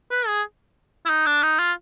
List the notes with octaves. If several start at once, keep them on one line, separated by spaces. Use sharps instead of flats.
B4
G#4
E4
D#4
D4
D#4
F4